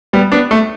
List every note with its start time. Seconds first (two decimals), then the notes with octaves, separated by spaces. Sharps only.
0.13 G3 B3
0.32 B3 D4
0.51 A3